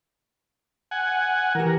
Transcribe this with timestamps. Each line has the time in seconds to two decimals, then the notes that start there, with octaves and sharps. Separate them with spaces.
0.91 F#5 G#5
1.55 E3 G4 A#4